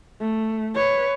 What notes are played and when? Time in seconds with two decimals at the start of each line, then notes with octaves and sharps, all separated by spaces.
0.20 A3
0.74 B4 C#5